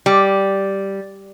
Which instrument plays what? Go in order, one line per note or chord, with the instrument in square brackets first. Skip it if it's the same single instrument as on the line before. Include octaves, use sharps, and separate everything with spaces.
[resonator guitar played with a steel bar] G3